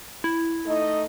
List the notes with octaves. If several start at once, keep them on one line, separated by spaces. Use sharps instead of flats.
E4
A3 D#4 D#5